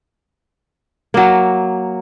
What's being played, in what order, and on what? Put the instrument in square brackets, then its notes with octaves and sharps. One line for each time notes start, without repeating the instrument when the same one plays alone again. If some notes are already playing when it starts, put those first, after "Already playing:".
[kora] F#3 A#3